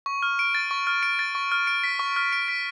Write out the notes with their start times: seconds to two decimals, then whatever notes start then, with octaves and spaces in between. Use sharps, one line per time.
0.06 C#6
0.22 F6
0.39 D7
0.55 A6
0.71 C#6
0.87 F6
1.03 D7
1.19 A6
1.35 C#6
1.52 F6
1.67 D7
1.84 B6
1.99 C#6
2.16 F6
2.33 D7
2.48 B6